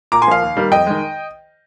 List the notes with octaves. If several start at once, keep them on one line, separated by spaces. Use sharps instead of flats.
A#2 A#5 D6
G#5 C6
F3 A#3 F5
D#2
D#3 G3 A#3
F2 D#5 G5
D#3 G#3